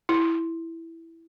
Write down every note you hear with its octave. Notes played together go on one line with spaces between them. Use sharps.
E4